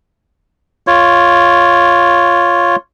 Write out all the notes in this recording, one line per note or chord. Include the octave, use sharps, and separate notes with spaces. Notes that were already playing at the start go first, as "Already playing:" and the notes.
F4 C#5